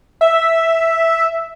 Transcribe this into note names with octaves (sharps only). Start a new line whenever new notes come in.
E5